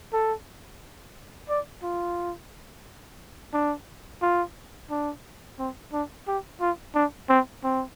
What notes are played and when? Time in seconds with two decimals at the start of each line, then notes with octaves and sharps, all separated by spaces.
0.13 A4
1.49 D5
1.83 F4
3.53 D4
4.22 F4
4.90 D4
5.59 C4
5.93 D4
6.28 G4
6.61 F4
6.95 D4
7.29 C4
7.64 C4